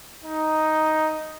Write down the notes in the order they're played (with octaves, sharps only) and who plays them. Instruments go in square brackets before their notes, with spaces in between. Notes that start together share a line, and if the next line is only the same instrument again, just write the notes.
[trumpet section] D#4